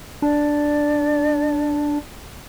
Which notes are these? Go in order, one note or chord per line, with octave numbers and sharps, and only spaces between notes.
D4 D5